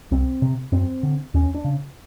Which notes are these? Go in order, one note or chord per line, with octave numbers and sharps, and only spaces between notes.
C2 C4
C3
F#2 C4
D3
D#2 C#4
D4
C#3